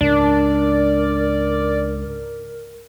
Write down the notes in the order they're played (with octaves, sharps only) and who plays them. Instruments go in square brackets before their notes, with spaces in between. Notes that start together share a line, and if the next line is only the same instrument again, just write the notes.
[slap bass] C#2 G#2 [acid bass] D4 [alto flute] A#4 [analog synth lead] D5